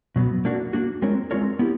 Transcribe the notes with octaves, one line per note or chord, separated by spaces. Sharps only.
B2 F#3 B3
A#3 D4 F#4
A#3 D4 F#4
G#3 C4 F4 A#4 C#5
G#3 C4 F4 A#4 C#5
B3 E4 G4